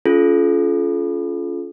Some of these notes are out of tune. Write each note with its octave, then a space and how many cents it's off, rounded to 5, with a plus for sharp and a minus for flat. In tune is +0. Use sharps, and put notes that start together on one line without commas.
C#4 +30 F4 +0 A4 -40